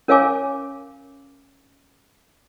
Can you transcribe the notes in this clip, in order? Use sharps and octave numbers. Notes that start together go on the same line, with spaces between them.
C#4 A#4 C#5 F5 G#5 D6